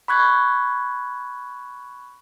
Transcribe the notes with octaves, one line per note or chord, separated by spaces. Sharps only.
B5 C#6 F#6 G#6